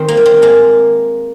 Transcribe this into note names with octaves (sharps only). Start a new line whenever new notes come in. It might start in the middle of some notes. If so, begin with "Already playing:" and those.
Already playing: D#3 C4
A#3
G3
C4
G#3 A#3